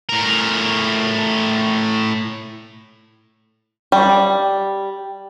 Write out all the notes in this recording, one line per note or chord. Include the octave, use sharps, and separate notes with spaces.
A2 A#4
G3